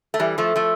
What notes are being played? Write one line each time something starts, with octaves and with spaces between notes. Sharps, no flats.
A3
E3 G3
F3 A3
F3 A3